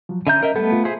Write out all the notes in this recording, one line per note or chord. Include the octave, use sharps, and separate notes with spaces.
F3 F#3
D3 C#4 E5 A#5 G6
A#4 D#5 E5
G3 A3 B3 A4
F4
G#4 C5 E5